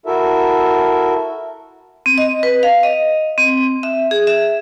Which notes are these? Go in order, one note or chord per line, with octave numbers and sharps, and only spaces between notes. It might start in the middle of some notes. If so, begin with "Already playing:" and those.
E4 F#4 A4 A#4 E5
C4
D#5
B4
F5
D#5
C4
E5
G#4
E5